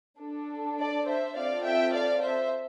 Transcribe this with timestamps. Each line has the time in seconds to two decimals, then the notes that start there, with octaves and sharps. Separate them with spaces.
0.20 D4 A4
0.78 D5
1.06 C5 E5
1.35 C4 F4 A4 D5 F5
1.64 E5 G5
1.93 D5 F5
2.21 C5 E5